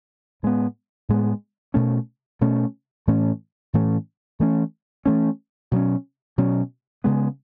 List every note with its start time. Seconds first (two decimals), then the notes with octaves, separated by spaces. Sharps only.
0.43 A2 G#3 B3
1.09 A2 G#3 B3
1.74 B2 A3 C#4
2.41 B2 A3 C#4
3.07 A2 E3 A3 C#4
3.73 A2 E3 A3 C#4
4.40 E3 A3 C#4
5.06 E3 A3 C#4
5.71 B2 F#3 C#4
6.38 B2 F#3 C#4
7.04 C#3 G#3 B3